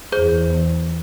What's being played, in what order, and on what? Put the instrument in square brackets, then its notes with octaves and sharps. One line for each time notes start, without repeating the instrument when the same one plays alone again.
[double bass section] E2 [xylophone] G#4 C5 G6